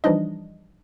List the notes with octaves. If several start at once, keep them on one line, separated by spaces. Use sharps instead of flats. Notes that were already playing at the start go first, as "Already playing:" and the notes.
E3 F3 G3 D4 D#4 D#5